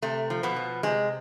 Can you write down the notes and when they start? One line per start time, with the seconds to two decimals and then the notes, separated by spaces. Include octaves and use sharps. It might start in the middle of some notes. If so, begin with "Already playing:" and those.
0.02 C3 A3
0.30 F3
0.43 B2 B3
0.56 F3
0.83 C3 G#3